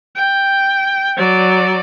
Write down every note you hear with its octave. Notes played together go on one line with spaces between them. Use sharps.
G5
F#3 D5